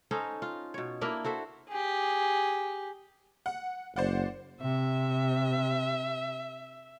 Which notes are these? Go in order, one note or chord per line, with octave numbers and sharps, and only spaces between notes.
C#4 D#4 A4 C5
F4
B2 C#5
A#3 D4 E4 A#4
F#4 A4 C5 E5
G4 G#4
F#5
F#1 C5 D5 F#5
C3 E5